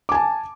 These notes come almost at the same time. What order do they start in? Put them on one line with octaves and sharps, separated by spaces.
D6 G#5 A5